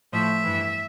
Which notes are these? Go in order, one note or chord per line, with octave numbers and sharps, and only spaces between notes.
A2 F3 E5
G2 E3